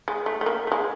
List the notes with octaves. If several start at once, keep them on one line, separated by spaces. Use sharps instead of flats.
G#3
A3
A3
A#3
A3
G#3